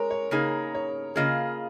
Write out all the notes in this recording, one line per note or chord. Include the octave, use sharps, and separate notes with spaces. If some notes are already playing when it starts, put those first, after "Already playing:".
Already playing: G#3 A#4 C#5
C#5
C#3 A#3 D#4 G#4
C#5
C#3 A#3 F4 G#4 D#5